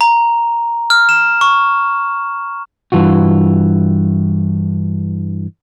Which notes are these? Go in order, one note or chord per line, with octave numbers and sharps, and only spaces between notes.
A#5
F6
E7
C#6
G2 E3 F4 F#4